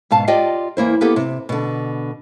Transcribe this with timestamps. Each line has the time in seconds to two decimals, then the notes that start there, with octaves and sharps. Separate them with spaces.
0.11 G#2 B2 F5 A5
0.27 F4 G4 D5 D#5 G5
0.77 E2 A#3 E4 C5
1.01 A#3 B3 G4 A4 B4
1.16 C3
1.49 B2 D3